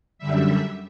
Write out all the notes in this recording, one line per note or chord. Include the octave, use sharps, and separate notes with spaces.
F#2 D3 G3 E5